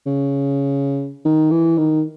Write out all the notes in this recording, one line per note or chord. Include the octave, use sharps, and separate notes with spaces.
C#3
D#3
E3
D#3